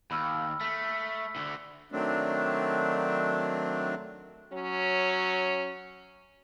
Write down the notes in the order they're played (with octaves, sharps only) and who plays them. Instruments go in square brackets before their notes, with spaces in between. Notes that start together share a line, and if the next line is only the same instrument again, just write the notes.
[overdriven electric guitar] D#2 [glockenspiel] B5 E6 F6
[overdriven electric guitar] A3 [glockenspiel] B6
[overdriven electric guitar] D2 D3
[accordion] D#3 F#3 A3 C4 D4
[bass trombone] F#3 [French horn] C#4